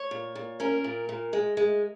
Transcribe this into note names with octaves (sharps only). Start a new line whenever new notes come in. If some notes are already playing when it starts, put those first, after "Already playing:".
Already playing: C#5
A#2
A#2
C#4 A#4
A#2
A#2
G#3
G#3